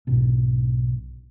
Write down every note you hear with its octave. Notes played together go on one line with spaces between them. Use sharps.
B1 G#2 B2